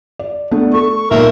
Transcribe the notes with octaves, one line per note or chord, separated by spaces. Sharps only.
D5
A3 B3 D4
A4 C#6
B1 A#2 A#4 E5